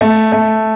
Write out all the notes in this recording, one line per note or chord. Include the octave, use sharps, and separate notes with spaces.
A3
A3